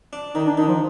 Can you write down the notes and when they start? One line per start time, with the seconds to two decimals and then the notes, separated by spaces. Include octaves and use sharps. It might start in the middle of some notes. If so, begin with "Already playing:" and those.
0.13 D4
0.35 D#3 D#4
0.47 D4
0.57 D#3 D#4
0.68 F3